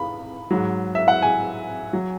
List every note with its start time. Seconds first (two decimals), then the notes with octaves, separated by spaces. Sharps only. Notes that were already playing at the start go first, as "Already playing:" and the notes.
Already playing: B5
0.51 G#2 F#3
0.95 E5
1.08 F#5
1.22 G#5
1.93 F#3